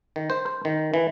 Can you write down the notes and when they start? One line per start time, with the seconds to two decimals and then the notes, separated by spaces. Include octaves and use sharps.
0.16 D#3
0.30 C5
0.46 C5
0.65 D#3
0.94 E3